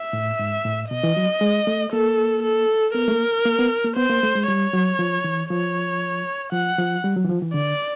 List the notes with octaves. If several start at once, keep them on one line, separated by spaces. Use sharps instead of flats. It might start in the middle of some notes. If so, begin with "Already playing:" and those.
Already playing: E5
A2
G#2
A2
B2 D#5
E3
F#3
G#3
A3
A#3 A4
A4
B3 A#4
A3
A#3
A#3
B3
A#3
B3 C5
A#3
A3
G#3
G3 C#5
F#3
F3
E3
F3 C#5
F3 F#5
F3
G3
F#3
E3
F3
E3
D3 D5